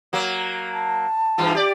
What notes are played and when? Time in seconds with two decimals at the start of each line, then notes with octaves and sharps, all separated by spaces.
0.13 F#3 A#3
0.73 A5
1.38 G2 E3 F4
1.55 G4 D5